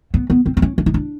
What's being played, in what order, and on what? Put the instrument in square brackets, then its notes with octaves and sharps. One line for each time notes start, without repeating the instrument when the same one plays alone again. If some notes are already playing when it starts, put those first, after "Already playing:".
[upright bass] B3
B3
C4
C4
C#4
D4
D#4
D4